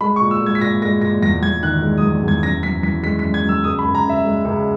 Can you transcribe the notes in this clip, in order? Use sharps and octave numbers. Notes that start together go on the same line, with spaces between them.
G#3 B5
C#6
A#2
E6
G#3
G#6
B6
A#2 A#6
G#3 A#6
A#2 A#6
E2 A#6
E2 G#6
D#3 F#6
G#3
D#6
E2
E2 G#6
F#2 A#6
F#2 B6
E3 B6
G#3 B6
B6
F#2
G#6
F#2 E6
C#2 D#6
B5
C#2
A#5
C#3
E5
G#3
C#2